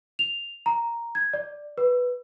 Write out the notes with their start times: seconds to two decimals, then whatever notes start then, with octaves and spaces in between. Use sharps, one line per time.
0.19 F7
0.66 A#5
1.15 G#6
1.33 D5
1.78 B4